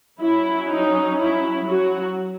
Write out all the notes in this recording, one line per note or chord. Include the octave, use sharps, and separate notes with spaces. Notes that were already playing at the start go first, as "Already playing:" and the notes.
F#3 C#4 E4
D#4
E4
F#3 F#4